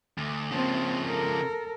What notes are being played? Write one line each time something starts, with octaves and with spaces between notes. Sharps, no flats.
D2
C#3 F3 A#3 C4
A4 A#4